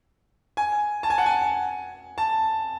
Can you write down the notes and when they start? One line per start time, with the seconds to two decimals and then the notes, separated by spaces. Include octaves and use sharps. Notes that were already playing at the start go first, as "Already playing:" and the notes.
0.57 G#5
1.03 A5
1.10 G#5
1.18 F#5
1.26 G#5
2.18 A5